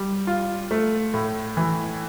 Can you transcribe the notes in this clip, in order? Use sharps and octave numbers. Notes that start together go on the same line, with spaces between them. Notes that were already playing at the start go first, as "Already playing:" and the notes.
Already playing: G3
F4
A3
A2
E3